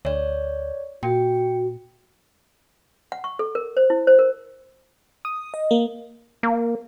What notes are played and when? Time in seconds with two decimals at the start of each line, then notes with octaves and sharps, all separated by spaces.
0.05 D2 C#5 D5
1.03 A#2 F#4 G5
3.12 F#5
3.24 C#6
3.39 A4
3.55 A#4
3.77 C5
3.90 E4
4.07 C5
4.19 A#4
5.25 D#6
5.54 D#5
5.71 A#3
6.43 A#3